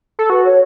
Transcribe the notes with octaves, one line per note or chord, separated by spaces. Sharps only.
A4
F#4 B4
C#5